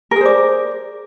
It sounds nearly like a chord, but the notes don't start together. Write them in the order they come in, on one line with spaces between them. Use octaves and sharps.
A#4 G#4 C5 D5